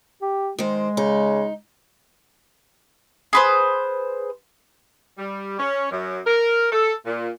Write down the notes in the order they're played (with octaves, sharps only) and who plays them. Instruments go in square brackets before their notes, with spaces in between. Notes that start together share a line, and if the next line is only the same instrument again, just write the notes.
[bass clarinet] G4
[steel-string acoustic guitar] D#3 C5 [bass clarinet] G#3
[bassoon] C#3 [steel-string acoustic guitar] D#4
[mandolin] G#4 B4 C5
[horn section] G3
C#4
F#2
A#4
A4
A#2